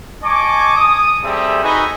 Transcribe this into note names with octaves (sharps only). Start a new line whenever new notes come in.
D#5 G#5 A5 C#6 D6
D#6
G3 C4 G#4 A4 E5
D#4 F#4 B4 D#5 G#5 B5